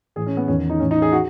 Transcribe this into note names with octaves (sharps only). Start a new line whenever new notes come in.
A2 E3 G#4
C#4
B3
E2 D#3 C#4
D#4
A2 E3 C#4
D#4
G#4
F#4